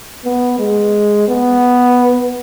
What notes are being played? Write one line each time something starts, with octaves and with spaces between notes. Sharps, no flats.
B3
G#3
B3